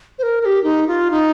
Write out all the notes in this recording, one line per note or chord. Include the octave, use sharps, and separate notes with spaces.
C5
A#4
A#4
G4
D#4
F4
D#4